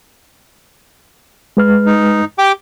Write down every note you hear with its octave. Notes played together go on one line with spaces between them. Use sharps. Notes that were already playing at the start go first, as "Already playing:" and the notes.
G#3 B4 F6
D#4
G4 G5 D6